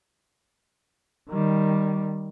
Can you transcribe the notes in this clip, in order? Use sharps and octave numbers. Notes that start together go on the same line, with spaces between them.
D#3 G3